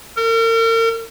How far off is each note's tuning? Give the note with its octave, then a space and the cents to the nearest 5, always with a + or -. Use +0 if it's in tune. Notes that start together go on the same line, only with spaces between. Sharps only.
A#4 -40